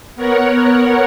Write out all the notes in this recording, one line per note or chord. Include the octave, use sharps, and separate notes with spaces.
B3 A#4 C#5 F#5